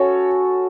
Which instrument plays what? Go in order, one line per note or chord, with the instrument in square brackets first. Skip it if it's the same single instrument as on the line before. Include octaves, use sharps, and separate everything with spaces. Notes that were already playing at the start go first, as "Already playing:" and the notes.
Already playing: [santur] C#4 F#4 A4 [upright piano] C#5